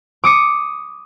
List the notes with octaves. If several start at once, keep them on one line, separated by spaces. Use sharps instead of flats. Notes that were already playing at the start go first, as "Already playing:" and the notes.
D6 D#6 C#7